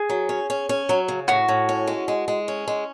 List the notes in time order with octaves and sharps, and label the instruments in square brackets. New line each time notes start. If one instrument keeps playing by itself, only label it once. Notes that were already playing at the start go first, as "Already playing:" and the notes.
Already playing: [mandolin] G#4
[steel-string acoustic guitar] F#3
C#4
C#4
C#4
F#3
C#3
[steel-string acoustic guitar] A2 [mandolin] F#4
[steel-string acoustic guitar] A2
C#4
G#3
G#3
G#3
C#4
G#3